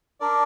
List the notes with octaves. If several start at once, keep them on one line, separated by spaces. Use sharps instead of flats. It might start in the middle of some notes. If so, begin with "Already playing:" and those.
D4 A#4 D5